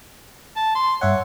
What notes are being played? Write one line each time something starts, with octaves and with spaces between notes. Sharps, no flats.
A5
C6
G2 C#5 E5 F#5